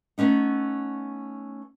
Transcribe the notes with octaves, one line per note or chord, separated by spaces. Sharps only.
A3 B3 C#4 D#4